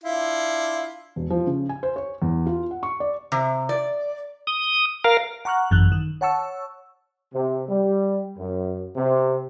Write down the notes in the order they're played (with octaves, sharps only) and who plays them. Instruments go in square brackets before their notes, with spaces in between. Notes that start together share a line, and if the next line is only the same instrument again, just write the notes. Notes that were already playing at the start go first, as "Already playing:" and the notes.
[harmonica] D4 E4 F4
[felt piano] E1
F3
C#3
G#5
C5
C#5
E2
F4
F#5
C#6
D5
[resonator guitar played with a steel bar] C3
D5
[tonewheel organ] D#6
A#4 F5
[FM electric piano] F#5 A#5 C#6 F6 F#6
G#1 F#2 E3 F#6
D#3
C#5 F#5 A5 C#6 E6
[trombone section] C3
G3
F#2
C3